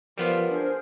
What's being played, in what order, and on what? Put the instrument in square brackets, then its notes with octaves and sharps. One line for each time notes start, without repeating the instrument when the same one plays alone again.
[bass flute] F3 [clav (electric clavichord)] G3 B3 F4 [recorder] A#4
[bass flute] D4 [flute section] G#4 C5